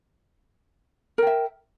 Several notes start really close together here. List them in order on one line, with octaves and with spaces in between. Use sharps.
A#4 G5 E5